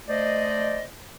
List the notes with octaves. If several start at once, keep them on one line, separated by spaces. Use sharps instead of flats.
A3 C5 D5 D#5